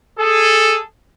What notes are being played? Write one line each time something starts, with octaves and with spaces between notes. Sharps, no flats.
G#4 A4